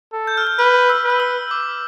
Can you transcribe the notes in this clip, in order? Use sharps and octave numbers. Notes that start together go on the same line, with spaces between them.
A4
G6
F6
G6
B4 F6
E6
B4
F6
E6
D6